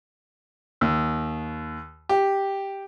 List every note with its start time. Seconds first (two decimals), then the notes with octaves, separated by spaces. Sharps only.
0.81 D#2
2.09 G4